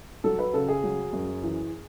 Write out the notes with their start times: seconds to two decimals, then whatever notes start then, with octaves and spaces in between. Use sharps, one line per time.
0.24 F#3 A4
0.39 B4
0.53 C#3 A4
0.69 G#4
0.84 F#3
1.13 F#2
1.43 E3